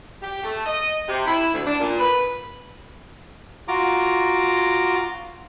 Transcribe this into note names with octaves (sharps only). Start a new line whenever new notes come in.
G4
A3
D#5
C3
E4
D2
D4
A#2
B4
F4 F#4 A#5 D6